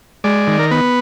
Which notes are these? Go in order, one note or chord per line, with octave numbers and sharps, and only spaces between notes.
G#3 D5
D#3
A#4
B3 B4